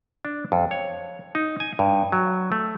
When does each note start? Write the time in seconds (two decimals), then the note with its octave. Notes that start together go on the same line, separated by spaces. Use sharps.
0.25 D4
0.52 F2
0.71 C#5
1.35 D#4
1.60 G#5
1.79 G2
2.12 F#3
2.52 A3